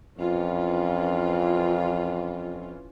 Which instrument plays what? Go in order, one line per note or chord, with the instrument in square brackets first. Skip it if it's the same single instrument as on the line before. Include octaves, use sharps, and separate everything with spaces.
[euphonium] F2 [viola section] E3 C#4 F4